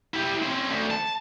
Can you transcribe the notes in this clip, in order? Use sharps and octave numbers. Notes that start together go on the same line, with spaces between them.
E4 G4
C4 C#4
D2
A5